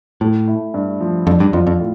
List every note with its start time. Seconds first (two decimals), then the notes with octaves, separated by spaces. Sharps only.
0.21 A2 A3
0.48 E4
0.74 G2
1.00 F3
1.27 F2 D4
1.40 G2
1.53 F2 F4
1.67 F2
1.79 A2